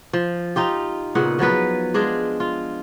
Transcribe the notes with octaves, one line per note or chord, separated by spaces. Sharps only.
F3
D#4 F4 G4
A#2 C#3 B3 F#5
F3 F#3 B3 B4
G#3 D4 F4 G#4
F4